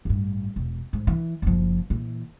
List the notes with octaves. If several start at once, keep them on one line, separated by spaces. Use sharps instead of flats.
A1 G2
E1
G#2
E3
F#1 F3
A#2 E3